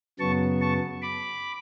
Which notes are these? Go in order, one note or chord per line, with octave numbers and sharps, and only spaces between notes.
F#2 C#3 F#3 B3 A5 C#6
A5 C#6
B5 D6